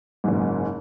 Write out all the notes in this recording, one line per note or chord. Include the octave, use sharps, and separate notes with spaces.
F#1 G#2